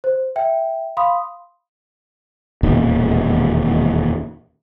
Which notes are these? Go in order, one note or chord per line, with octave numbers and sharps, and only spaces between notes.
C5
E5 G5
F5 B5 C6 D#6
E1 D#2 A#2 D#3